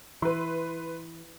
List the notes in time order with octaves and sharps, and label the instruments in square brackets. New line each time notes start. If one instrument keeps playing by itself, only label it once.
[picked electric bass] E3 [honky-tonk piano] B4 C6